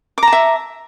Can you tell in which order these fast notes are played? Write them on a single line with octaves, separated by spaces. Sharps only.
D6 A#5 A5 E5